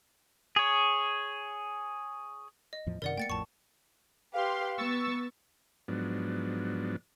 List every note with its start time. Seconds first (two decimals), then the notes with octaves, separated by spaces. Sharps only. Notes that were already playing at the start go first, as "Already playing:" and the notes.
0.56 G#4 C#5
2.73 D#5
2.86 E2 A2 F3
3.02 F#2 C3 D#3 A#4 D5 F#5
3.18 A3 A#3 G5 A6 C#7
3.30 A1 F2 A2 A5 C#6
4.33 G4 B4 F5 C6
4.77 B3 C#6 E6 A6
5.88 G#2 F3 F#3 B3 D4